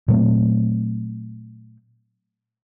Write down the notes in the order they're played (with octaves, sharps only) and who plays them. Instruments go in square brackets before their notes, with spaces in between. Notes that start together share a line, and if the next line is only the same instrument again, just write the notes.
[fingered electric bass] A#2 F#3 A3 C4